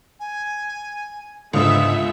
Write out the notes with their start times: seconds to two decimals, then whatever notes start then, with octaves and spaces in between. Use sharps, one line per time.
0.19 G#5
1.53 C#2 G#2 D3 B3 E5 D#6